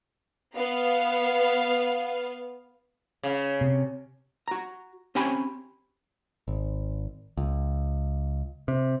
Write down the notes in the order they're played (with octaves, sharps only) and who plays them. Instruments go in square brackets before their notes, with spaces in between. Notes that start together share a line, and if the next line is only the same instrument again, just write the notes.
[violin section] B3 F5
[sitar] C#3
[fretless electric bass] C3
[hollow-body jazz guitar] F#4 A#5
C4 C#4 G4 G#5 B5
[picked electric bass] G#1
C#2
C3